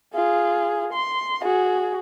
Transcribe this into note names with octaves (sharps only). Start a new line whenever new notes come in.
F4 G#4
C6
F#4 G#4